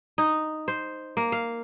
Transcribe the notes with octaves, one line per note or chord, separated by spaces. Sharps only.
D#4
C5
A#3
F5